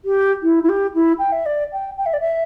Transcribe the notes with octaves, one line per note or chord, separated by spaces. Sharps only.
G4
E4
E4
G4
E4
G5
E5
D5
G5
G5
E5
D5
E5